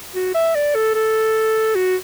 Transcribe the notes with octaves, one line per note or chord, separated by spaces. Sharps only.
F#4
E5
D5
A4
A4
F#4